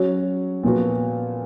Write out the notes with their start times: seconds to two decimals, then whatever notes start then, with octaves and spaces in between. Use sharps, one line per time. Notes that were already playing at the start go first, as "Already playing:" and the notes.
Already playing: F#3 C#4 F#4
0.63 A#2 F3 B3 F#4